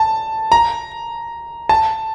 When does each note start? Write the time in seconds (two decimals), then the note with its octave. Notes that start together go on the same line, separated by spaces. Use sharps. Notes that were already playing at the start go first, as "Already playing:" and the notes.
Already playing: A5
0.52 A#5
1.69 A5